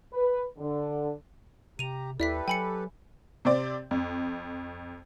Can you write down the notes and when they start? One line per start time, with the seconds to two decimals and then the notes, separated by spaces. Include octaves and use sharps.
0.13 B4
0.59 D3
1.79 C3 G4 A#5 D#7 F7
2.20 D#2 E4 G4 A4 B4 D5 E5 B6
2.48 F#3 G5 G#5 B5 C#7
3.45 C3 C4 D5
3.91 F2